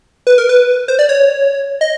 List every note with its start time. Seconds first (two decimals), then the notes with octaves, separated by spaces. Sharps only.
0.27 B4
0.38 A#4
0.49 B4
0.88 C5
0.99 D5
1.09 C#5
1.81 D#5